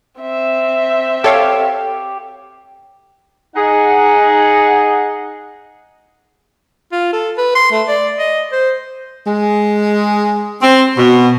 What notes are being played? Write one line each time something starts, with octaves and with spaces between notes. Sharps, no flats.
C4 E5
G4 A4 C#5 F5
D#4 G#4 F#5
F4
A4
B4
C6
A3
D5
D#5
C5
G#3
C4
B2